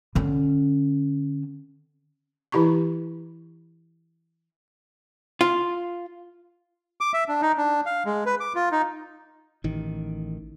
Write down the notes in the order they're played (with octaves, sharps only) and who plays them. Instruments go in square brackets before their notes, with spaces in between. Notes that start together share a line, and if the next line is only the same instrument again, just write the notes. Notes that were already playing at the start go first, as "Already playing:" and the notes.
[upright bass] D3 C#4
[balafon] E3 E4 G4 A#5 C#6
[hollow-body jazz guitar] F4
[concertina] D6
E5
D4
D#4
D4
F5
G#3
B4
D6
F4
D#4
[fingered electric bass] A1 D#3